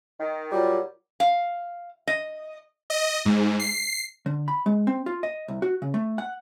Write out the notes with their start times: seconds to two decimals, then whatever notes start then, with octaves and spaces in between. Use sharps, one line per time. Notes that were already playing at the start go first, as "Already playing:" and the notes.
0.19 D#3
0.52 A#2 F#3 G3 F4
1.20 F5
2.07 D#5
2.90 D#5
3.25 G#2
3.59 C7
4.26 D3
4.48 B5
4.66 G#3
4.87 C4
5.06 F4
5.23 D#5
5.48 C2
5.62 F#4
5.82 C#3
5.94 A3
6.18 F#5